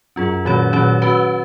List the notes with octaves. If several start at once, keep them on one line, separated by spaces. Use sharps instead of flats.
F#2 C#4 F4 G#4
A#2 D#3 F#3 C#4 F#4 C#5
A#2 D#3 F#3 C#4 F#4 C#5
C#4 F#4 B4